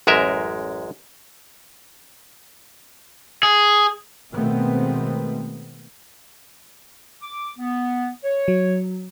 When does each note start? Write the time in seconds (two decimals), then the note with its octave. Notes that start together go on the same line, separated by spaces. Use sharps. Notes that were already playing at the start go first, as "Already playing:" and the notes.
0.07 A1 F#2 G#3 A#4 E5
3.43 G#4
4.35 B2 D#3 G#3 A3 B3 C4
7.22 D6
7.59 B3
8.24 C#5
8.48 F#3